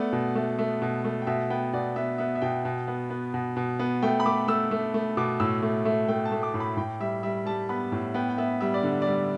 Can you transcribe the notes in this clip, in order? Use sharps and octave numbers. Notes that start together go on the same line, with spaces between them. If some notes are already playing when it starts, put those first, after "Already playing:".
Already playing: A3 B3 D5
B2
A3
A3
B2
A3
G5
B2 E5
B3 G5
B2 D5
B3 E5
B3 E5
E5
B2 G5
B2
B3
B3
B2
B2
B3
A3 G5
B5
A3 D6
A3 E6
A3
A3
B2 D6
A2 E6
A3
A3
A3 G5
A5
A3
D6
A2
B5
A2 G5
G3 E5
G3 E5
G3 A5
B3 B5
A2
B3 G5
G5
B3 E5
G3 E5
D5
D3
D5
G3